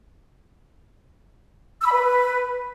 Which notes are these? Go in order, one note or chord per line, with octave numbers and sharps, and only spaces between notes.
E6
B5
B4